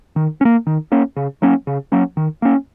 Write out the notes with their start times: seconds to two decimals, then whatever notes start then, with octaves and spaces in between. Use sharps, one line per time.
0.16 D#3
0.41 C#4
0.45 A#3
0.67 D#3
0.92 A#3 C#4
1.16 C#3
1.42 F#3 A#3 C#4
1.67 C#3
1.92 F#3 A#3 C#4
2.17 D#3
2.42 A#3 C#4